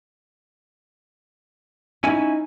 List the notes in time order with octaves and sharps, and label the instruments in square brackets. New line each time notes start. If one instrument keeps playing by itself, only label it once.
[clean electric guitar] C#4 E4 G#5 [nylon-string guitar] D#4